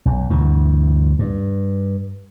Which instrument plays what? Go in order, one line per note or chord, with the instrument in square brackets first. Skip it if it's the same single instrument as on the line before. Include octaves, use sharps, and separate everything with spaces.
[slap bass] B1
D2 G2 E3
G2